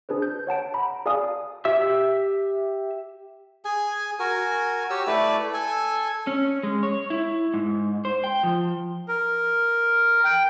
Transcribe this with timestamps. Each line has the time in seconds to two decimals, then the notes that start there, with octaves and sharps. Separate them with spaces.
0.09 D4 G#4 B4 C5
0.22 G6
0.47 C#5 F#5 A5 D7
0.74 A#5 B5
1.06 G#4 D5 F5 G#5 A5 D#6
1.65 G4 E5 E6
3.65 G#4 G#5
4.19 F#4 A#4 G#5
4.90 G4 C#5 E6
5.07 A3 E4 B4 D5
5.54 A4 G#5
6.27 C#4
6.63 G#3
6.83 C#5
7.10 E4
7.54 G#2
8.05 C5
8.24 G5
8.43 F3
9.08 A#4
10.24 G5